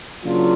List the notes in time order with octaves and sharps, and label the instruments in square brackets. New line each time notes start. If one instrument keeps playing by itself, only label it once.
[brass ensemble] C#3 F#3 A#3 D4 F4